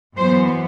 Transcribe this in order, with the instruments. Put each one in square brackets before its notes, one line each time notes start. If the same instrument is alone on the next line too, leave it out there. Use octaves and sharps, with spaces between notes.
[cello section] F#2 E3 B3 C5